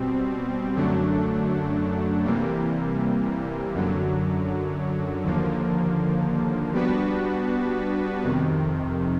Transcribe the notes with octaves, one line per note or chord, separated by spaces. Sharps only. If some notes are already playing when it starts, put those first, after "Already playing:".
Already playing: B2 G3 C4
F#2 D3 F#3 A3 D4
C3 E3 G3 A#3
F#2 D3 F#3
D#2 D3 F3 A#3
G3 B3 D4 F#4 B4
F2 C3 D#3